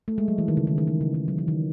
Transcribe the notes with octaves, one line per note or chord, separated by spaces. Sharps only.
A3
G#3
F#3
E3
D#3
C#3
D#3
D#3
E3
C#3
D#3
F#3
E3
D#3